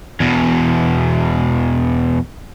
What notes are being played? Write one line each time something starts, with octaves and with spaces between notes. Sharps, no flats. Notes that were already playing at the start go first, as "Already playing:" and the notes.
E2 B2